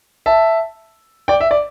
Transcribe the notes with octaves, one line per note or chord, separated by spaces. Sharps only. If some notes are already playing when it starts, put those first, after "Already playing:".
E5 A5
D5 G5
E5
D5